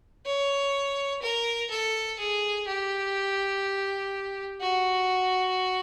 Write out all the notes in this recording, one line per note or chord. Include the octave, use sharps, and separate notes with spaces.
C#5
A#4
A4
G#4
G4
F#4